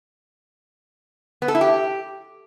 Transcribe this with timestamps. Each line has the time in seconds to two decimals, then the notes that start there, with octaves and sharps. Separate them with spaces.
1.42 B3
1.48 A4
1.55 E4
1.61 G4